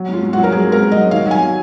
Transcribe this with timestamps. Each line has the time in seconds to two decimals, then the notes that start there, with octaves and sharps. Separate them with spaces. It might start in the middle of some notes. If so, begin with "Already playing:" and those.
Already playing: F#3
0.09 G#2 F4
0.23 G#2
0.33 F#4
0.38 F#3
0.44 A#4
0.52 F#3 G#4
0.67 G#2
0.72 A#4
0.82 G#2
0.92 D#5
0.97 F#3
1.11 D#3 F5
1.27 F#3 G#5